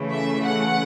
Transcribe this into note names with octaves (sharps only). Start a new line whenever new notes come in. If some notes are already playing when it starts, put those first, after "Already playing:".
Already playing: C#3 E3 A3
E5
F#5